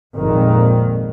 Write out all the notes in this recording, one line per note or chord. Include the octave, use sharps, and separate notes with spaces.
G#1 F2 A#2 D#3